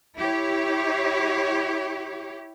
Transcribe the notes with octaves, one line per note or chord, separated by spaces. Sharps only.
E4 G4 C#5